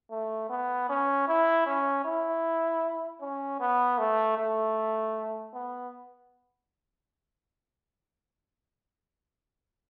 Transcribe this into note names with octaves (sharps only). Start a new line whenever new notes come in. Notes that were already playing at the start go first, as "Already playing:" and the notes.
A3
B3
C#4
E4
C#4
E4
C#4
B3
A3
A3
B3